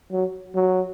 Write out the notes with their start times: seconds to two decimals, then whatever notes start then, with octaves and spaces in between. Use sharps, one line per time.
0.11 F#3
0.55 F#3